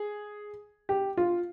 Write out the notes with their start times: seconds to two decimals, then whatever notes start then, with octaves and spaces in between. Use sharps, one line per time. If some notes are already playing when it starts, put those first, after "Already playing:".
Already playing: G#4
0.89 G4
1.17 F4